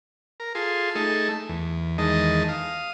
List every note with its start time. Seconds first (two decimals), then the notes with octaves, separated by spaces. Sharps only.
0.40 A#4
0.55 F4 G#4 A4 C6
0.95 A3 D#4 G#4 A4
1.49 E2
1.98 E2 D#3 G#3 D#5 A5
2.49 F5 D#6